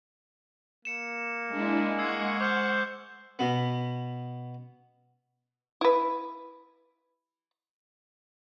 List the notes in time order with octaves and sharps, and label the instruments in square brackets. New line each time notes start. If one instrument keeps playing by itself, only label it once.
[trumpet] A#3 [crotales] C#7 E7
[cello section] G#3 [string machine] D4 E4
[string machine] F#5 C#6 [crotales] E6 G#6 C7
[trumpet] C5 [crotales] D6 F6 G6
[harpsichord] B2 B3
[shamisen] E4 B4